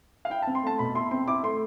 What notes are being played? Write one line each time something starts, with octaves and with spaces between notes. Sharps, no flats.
F5
E4 G5
A5
C4
C6
A3 A5
B2 B5
E4 C6
C4 C6
E4 D6
A3 C6